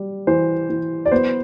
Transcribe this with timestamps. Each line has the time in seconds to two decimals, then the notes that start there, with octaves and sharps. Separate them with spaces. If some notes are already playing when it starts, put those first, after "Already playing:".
Already playing: G3
0.27 E3 C5
0.70 E3
1.06 D5
1.12 B3 C5